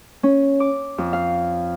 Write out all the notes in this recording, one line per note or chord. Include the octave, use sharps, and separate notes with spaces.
C#4
D6
F2
F5